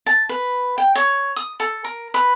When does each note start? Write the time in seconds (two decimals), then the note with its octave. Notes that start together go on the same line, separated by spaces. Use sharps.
0.06 A5
0.29 B4
0.78 G5
0.96 C#5
1.36 D#6
1.60 A4
1.85 A#4
2.14 B4